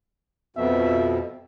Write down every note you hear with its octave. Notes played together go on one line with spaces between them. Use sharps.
F2 B2 E5